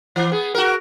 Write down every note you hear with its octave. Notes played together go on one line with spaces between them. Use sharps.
E3
B3 G#4
F#4 A#4